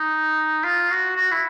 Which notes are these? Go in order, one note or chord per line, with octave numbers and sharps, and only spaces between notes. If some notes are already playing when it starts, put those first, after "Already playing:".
Already playing: D#4
F4
F#4
F#4
E4